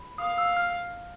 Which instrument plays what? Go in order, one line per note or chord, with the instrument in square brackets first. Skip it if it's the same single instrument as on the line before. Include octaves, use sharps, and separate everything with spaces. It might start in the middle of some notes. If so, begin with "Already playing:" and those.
Already playing: [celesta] B5
[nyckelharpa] F5 [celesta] D#6
[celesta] E6
F6